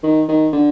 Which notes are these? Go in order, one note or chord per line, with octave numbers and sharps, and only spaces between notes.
D#3
D#3
D3